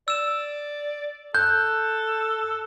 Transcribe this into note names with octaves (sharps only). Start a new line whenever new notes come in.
D5 E6 E7
A4 F#6 G6